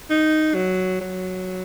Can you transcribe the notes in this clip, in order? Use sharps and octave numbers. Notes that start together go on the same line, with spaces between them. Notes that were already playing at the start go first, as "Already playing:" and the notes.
D#4
F#3
F#3